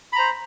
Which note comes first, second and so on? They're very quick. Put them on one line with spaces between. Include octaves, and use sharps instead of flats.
B5 A#5 C5